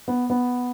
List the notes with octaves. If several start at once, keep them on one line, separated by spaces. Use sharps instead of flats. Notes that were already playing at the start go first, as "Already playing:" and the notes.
B3
B3